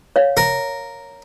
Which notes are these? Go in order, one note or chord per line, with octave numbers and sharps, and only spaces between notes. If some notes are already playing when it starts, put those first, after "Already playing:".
C#5 F5
A#4